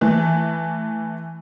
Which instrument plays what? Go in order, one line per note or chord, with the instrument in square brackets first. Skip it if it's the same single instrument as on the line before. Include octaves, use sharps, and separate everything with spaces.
[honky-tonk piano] E3 A3